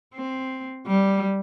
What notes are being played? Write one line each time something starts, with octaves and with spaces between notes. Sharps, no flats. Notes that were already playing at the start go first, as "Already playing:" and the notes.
C4
G3